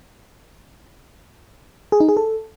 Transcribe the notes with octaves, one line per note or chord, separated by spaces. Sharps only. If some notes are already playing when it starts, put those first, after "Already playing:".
G#4
D#4
G#4
A4